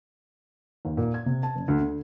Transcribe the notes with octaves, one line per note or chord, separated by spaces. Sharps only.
D#2
A#2
G#6
C3
A5
F#1
D2
D3